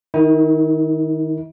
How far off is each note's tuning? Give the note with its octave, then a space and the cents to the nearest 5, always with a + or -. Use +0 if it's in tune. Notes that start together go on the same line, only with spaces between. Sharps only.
D#3 +0 E4 -45